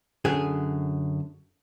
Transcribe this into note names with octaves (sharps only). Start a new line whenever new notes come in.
F#2 D3 G#4